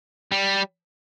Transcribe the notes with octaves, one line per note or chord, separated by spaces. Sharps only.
G3